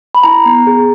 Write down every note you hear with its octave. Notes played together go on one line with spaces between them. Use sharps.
B5
E4 A#5
B3
G#4